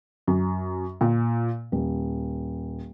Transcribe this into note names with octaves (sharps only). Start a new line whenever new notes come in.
F#2
A#2
D#1